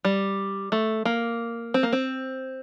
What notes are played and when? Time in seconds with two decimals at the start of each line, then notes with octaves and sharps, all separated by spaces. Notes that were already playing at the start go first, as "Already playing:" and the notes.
0.05 G3
0.72 A3
1.05 A#3
1.74 C4
1.83 A#3
1.93 C4